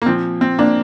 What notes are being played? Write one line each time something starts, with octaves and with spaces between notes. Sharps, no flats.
A#3
A#2 F3 C4
C4
A#3 D4